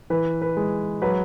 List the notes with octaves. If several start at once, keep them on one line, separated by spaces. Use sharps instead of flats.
E3 B4
B4
G#3
F#3 B4